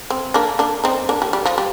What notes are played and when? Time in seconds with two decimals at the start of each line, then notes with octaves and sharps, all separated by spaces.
0.10 C4
0.34 A#3 D4
0.59 A#3 D4
0.84 C4 D#4
1.09 A#3 D4
1.22 G3
1.33 G3
1.45 F3
1.58 G3